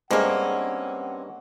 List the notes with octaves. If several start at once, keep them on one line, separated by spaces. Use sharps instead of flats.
G2 G#3 A#3 C4 C#4 F#5